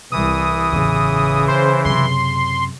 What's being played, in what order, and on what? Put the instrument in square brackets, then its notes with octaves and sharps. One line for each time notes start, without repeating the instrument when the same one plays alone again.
[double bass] C2 [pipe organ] E3 [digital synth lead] D#6
[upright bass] A1 E2 [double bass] C#3
[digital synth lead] C5
[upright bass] F#2 C3 [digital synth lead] C6